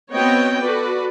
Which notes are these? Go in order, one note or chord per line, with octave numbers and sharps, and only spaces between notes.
B3 C4 F#4 C#5 D#5 G5
F#4 A4 B4 D5